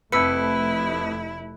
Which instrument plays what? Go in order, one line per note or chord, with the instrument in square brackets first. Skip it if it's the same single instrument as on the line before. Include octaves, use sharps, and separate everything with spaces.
[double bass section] F1 A3 [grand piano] F2 B4 [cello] E4 [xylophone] E6 B6 C#7